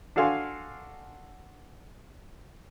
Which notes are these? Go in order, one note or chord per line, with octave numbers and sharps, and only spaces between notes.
D4 F#4 A4 F5 G#5 C6